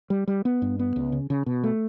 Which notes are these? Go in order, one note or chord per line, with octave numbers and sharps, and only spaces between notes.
G3
G3
B3
G2
B3
C#2
C#3
C#3
B2
A3